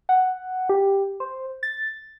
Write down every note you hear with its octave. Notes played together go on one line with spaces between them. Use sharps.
F#5
G4
C5
A6